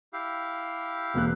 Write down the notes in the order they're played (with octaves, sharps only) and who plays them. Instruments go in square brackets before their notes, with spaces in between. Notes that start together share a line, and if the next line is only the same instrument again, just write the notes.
[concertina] E4 G4 F5
[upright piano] E1 A#3 F#6